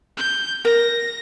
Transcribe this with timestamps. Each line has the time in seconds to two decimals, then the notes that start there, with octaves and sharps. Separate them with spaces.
0.17 G6
0.64 A#4 A#6